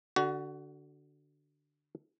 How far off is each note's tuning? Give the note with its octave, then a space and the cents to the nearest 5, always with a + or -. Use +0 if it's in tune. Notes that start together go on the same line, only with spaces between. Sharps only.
D3 +0 F#4 +20